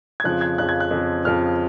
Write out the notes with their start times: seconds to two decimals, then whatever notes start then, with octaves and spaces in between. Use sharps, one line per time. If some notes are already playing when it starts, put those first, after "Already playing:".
0.20 G#6
0.24 F2 C#3 F3 F#6
0.41 G#6
0.58 F2 C#3 F3 F#6
0.69 G#6
0.80 F#6
0.91 F2 C#3 F3
1.24 F2 C#3 F3 F6